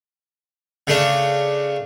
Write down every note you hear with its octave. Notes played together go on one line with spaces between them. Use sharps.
C#3 A3 D4